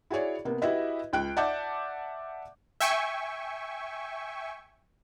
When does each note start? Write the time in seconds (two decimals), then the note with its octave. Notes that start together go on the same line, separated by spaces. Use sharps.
0.10 E4 F#4 G#4 C#5 D5
0.45 C3 A#3 B3
0.62 E4 F#4 G4 B4 D#5 E5
1.13 C#2 G5 F#6 D7
1.37 D5 E5 F#5 A5 D6 G6
2.80 E5 G5 G#5 C#6